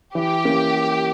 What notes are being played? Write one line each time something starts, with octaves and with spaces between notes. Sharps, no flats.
E3 G4
A#3 C#4